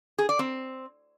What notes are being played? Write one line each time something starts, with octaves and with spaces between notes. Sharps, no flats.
G#4
D5
C4